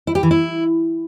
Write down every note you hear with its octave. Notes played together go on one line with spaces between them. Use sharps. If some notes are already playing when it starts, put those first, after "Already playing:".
E4
G4
E3
E4